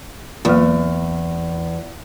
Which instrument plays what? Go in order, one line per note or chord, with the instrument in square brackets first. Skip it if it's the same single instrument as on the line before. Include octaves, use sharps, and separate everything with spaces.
[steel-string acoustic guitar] E2 [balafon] F#3 A#3